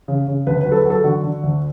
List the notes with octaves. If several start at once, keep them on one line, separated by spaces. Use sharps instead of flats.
C#3
C#3
D2 B4
F#3 B4
A4
B4
F#3
A4
D3 F#4
D3
D2